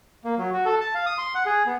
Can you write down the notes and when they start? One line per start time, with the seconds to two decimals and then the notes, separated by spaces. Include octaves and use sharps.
0.24 A#3
0.38 F#3
0.53 F#4
0.65 A4
0.81 A5
0.95 F5
1.06 D#6
1.18 C6
1.35 F#5
1.46 G#4
1.66 B3